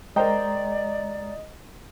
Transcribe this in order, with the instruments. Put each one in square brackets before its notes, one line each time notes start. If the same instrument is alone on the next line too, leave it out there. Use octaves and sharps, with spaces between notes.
[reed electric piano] G#3 A#5 [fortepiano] A#4 C5 G5 [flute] D5 [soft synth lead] D#5